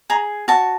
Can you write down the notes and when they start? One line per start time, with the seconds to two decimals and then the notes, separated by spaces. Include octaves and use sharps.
0.10 G#4 A#5
0.48 F#4 A5